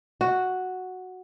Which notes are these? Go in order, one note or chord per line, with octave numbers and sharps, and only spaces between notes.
F#4